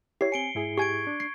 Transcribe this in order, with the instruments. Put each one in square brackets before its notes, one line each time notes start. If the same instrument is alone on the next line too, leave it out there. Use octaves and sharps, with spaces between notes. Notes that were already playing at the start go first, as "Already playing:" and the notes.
[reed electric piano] E4 [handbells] G4 C#5 [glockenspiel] C7
[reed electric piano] C4 G#5 [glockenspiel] C#7 D7 G7
[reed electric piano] G#2 E4 G#4
[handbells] G4 G#5 [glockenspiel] C#6 G#6 D7
[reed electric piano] D4
[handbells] C7